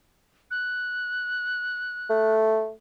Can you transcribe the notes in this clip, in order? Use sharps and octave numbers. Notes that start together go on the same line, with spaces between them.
F#6
A3